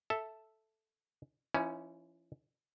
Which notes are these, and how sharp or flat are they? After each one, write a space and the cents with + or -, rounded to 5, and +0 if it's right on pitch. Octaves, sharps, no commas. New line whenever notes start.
A4 +0 E5 +0
E3 +45 C#4 +0 E4 -40